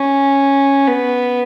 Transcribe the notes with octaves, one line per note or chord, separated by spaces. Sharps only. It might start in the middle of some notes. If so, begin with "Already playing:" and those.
Already playing: C#4
B3